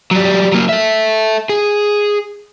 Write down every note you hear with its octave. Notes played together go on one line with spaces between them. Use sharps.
F#3 G3
F#3 A#3
A4 E5
G#4